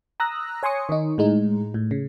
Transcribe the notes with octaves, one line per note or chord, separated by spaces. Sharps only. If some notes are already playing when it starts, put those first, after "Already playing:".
A#5 D#6 E6 F#6 A#6
C#5 G#5 C6 C#6 D#6 C#7
D#3 D#4
A2 G#3 D#4
A2
C#3